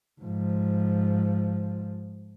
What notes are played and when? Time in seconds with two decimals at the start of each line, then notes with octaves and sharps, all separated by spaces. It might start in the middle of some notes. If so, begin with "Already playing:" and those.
0.20 G#2 F3